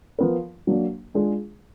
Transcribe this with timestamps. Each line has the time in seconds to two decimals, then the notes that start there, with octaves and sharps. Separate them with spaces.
0.19 F3 B3 F4 A#4
0.67 F#3 A#3 D4
1.14 G#3 D4 F4 G#4